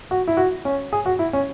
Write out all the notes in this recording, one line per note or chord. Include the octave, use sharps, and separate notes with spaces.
F#4
E4
F#4
C#4
G#4
F#4
E4
C#4